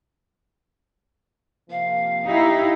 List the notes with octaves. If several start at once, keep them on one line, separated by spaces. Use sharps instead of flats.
C3 F3 A#3 F5
D#4 E4 G4